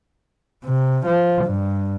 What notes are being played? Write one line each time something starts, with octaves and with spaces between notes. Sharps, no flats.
C3
F3
G2